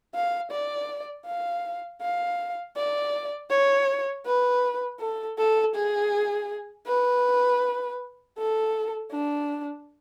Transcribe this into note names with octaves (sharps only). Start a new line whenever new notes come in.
F5
D5
F5
F5
D5
C#5
B4
A4
A4
G#4
B4
A4
D4